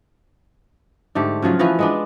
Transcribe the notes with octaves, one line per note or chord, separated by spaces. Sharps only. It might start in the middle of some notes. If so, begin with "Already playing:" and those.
G#2 D3 A3 G4
C#3 F3 F#3 F4
E3 F3 B3 F#4
G#3 B3 D4